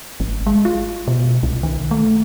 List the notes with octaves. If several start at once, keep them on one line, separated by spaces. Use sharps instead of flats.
G#1
G#3
F4
B2
C2
D#3
A3